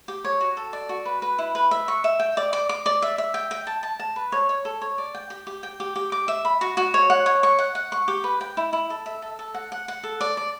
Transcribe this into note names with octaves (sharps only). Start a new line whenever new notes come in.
G4
C#5
F#4
A4
D5
F#4
B4
B4
E4
B4
E5
C#6
E5
G5
D5
D6
D6
D5
E5
E5
G5
G5
A5
A5
A5
B4
C#5
C#5
A4
C#5
D5
G5
G4
G4
G5
G4
G4
D6
E5
B5
F#4
F#4
C#5
F#5
C#5
C#6
F#5
F#5
C#6
G4
B4
G5
E4
E4
A4
E5
A4
A4
F#5
F#5
F#5
A4
D5
D5